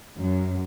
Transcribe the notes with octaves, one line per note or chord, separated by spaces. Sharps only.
F#2